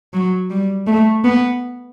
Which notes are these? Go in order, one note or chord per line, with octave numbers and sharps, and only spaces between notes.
F#3
G3
A3
B3